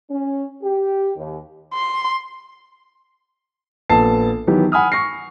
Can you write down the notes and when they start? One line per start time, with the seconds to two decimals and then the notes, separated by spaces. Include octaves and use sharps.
0.10 C#4
0.63 G4
1.16 D#2
1.74 C6
3.89 A#1 B3 A4 A5 C7
4.47 D#3 E3 F#3 B3 G4
4.72 F#5 G#5 B5 D#6 F6
4.92 C#6 A#6 C7